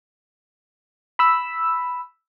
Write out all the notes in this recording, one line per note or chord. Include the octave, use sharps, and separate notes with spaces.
B5 E6